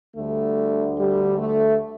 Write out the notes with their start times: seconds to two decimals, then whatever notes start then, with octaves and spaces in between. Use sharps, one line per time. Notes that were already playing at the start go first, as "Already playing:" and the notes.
0.15 D2 D3 G3 A3
0.97 G3
1.37 A3